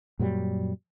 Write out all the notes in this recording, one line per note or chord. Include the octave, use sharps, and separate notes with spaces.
F#2 A#2 F#3 G3